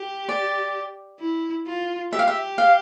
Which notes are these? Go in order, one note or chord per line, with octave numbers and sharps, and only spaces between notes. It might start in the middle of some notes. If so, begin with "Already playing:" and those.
Already playing: G4
D5
E4
F4
G4 E5
F5
E5
F5